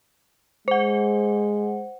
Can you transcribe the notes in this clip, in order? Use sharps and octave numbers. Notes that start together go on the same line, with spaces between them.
G#3 C5 F#5